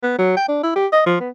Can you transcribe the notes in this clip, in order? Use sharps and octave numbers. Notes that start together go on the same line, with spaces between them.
B3
F#3
G5
D4
E4
G4
D#5
F3
B3